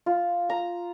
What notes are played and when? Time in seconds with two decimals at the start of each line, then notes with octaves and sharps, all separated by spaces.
0.06 F4
0.50 A#5